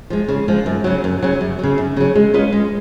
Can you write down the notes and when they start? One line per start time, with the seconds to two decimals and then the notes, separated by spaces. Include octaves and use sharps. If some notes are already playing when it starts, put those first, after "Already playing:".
0.10 F3 G#3
0.28 C#3
0.48 F3 G#3
0.66 F#2
0.84 C#3 F#3
1.04 F#2
1.23 C#3 F#3
1.41 F#2
1.59 C#3 F#3
1.78 F#2
1.97 C#3 F#3
2.15 G#3
2.34 C#4 F4 B4 D#5
2.53 G#3